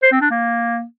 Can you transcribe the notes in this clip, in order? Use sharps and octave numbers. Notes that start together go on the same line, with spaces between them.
C5
C4
D4
A#3